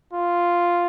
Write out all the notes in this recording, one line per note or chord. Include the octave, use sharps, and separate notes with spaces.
F4